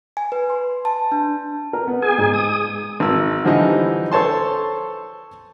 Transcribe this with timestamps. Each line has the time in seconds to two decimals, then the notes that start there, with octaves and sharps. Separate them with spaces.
0.17 G#5
0.32 B4
0.50 C6
0.85 A5
1.12 D4
1.73 A#4
1.87 B3
2.02 G#4 G#5
2.18 G#2
2.33 D#6
3.00 G#1 E6
3.45 D3 E3 F3 G3 D#4
4.12 A4 C5 C#5 A5 C6